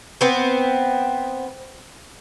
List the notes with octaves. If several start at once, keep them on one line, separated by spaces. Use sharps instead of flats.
B3 C4